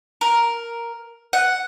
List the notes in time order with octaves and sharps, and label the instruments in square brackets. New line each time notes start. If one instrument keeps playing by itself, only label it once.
[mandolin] A#4
F#5